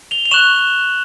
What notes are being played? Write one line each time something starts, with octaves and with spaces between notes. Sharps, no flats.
F7 G7
F7
C#6 F#6 E7 F#7